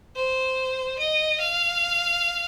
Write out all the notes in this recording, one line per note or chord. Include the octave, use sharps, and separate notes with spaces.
C5
D#5
F5